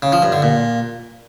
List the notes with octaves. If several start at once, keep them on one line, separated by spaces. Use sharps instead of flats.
C#3
F3
G2
D3
A#2